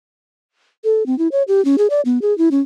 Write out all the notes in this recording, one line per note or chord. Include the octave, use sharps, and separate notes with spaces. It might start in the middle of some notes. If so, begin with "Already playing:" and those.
A4
C4
E4
C#5
G4
C#4
G#4
D5
B3
G#4
E4
C#4